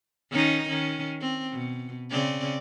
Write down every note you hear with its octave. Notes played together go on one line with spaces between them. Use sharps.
D#3 C#4 D#4
D#3 C#4
C4
B2
C#3 C4 D5